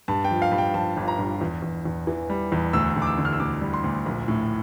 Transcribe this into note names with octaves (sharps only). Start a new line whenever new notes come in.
G2 A5
G5
F3
F5
G2
G5
F3 A5
G1
A#5
G2
E2
E2
E2
E3
G3
E2
D2 E6
D2
D6
E6
D3
F6
E6
D2 D6
G3
C6
D2
A#1
A2